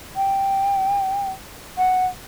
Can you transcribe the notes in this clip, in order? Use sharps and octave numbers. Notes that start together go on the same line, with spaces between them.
G5
F#5